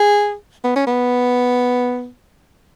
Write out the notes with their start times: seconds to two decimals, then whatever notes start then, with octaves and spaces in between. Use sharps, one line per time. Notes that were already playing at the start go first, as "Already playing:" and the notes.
Already playing: G#4
0.64 B3
0.76 C#4
0.87 B3